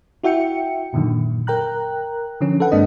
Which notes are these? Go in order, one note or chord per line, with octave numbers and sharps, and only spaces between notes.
E4 F#4 E5 G5 C#7
F#2 A#2 D3 D#3 F#3
A#4 G5 A#5 F#6
D3 F3 C#4
A4 B4 F#5
G2 G#3 A#3 C4 D4 D#5